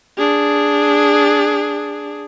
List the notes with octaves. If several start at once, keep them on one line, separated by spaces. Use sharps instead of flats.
D4 G#4